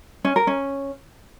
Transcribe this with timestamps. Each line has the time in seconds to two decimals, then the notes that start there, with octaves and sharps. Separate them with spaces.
0.25 C#4
0.36 A#4
0.47 C#4